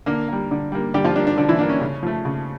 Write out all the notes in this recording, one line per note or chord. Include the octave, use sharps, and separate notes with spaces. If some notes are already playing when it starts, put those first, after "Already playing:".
D3 A#3 A#4
G3 A#3
D3
G3 A#3
D3 G3 G4
F3 F4
G3 A#3 D4
D4
D3 D4
E3 E4
G3 A#3 D4
C#4
C#3
F3 A3
C#3